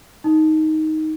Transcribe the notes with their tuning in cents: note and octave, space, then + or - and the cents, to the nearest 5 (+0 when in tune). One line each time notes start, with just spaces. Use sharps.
D#4 +10